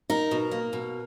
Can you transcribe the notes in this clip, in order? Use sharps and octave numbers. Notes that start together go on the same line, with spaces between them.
D#4 A#4
B2
A#3
B2